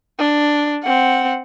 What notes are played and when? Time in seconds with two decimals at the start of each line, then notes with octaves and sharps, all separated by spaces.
0.19 D4
0.83 C4 F#5